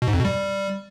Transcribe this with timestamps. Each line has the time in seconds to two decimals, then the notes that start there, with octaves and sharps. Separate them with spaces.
0.02 B2
0.08 G#2
0.13 F2
0.19 B2
0.25 G3